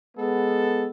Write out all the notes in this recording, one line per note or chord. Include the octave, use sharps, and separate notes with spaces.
G#3 B3 A4